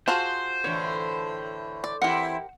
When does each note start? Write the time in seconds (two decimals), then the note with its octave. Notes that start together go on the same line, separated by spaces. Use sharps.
0.08 F4 F#4 G#4 C5 A5
0.64 A2 D3 E3 C#5
1.84 D5
2.02 E3 C4 E4 G4 A#4 F#5